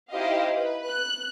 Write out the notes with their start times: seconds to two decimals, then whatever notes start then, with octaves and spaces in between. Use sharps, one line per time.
0.12 D#4 E4 G4 C5 D#5 F5
0.54 B4
0.90 F#6